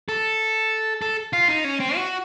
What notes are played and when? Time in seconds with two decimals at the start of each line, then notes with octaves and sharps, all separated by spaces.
0.09 A4
1.02 A4
1.33 F4
1.48 D#4
1.64 C#4
1.80 C4
1.96 F#4